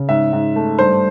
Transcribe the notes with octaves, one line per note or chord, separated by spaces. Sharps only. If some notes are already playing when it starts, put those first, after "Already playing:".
Already playing: C#3
G#2 E5
G#2
A3
G2 C5